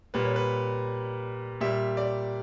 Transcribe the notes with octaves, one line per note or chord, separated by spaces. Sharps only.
A#2 G3 B4
C#5
B4
A#2 G3 E5
D5